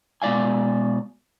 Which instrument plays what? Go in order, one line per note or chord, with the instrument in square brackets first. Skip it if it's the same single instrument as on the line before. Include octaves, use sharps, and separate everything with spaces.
[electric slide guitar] B2 G#3 D5 F5 G#5